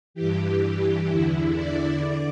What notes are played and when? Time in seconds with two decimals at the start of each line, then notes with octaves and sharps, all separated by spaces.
0.14 G2 E3 G4
1.08 E2 D3 E4
1.55 D5
2.01 D3